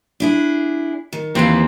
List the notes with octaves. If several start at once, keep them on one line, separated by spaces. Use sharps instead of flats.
D4 E4 G#4
D#3
D#2 E3 C4 B4 F5